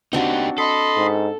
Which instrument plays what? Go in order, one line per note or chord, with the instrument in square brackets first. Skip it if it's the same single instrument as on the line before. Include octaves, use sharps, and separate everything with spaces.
[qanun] C4 D4 F#4 [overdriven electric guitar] D#4 G4
[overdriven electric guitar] A4 [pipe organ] D#5 B5 C6
[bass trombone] G#2